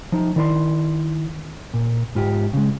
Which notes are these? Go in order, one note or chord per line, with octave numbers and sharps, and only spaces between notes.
F3 D#4
D#3 E4 D5 E5 C6
A#2
G#2 F4 G4
C#3 G#3